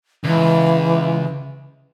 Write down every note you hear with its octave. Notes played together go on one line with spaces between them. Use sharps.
C#2 E3